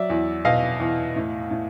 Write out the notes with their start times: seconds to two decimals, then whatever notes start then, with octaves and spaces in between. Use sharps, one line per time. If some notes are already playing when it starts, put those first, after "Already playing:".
Already playing: F#3 D5 E5
0.10 E2
0.45 B2 D#5 F5
0.80 E2
1.16 A2
1.51 A2